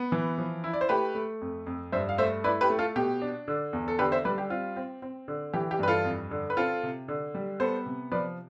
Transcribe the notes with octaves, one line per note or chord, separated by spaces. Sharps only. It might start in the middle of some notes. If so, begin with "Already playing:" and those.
Already playing: B3
E3
F3
E4
D5
C5
A3 G4 B4
A3
F2
F2
G2 C5 E5
F5
A3 C5 E5
E4 B4 D5
G4 B4
A3
F4 A4
B2 G4
D4
D3
E2
A4
D3 G4 B4
C5 E5
G3 B4 D5
G4
C4 F4
C4
C4
D3
E3 G4
G4
G2 B4
F4 A4
F2
D3
B4
C4 F4 A4
C3
D3
G3
B3 A4 C5
C3
F3 B4 D5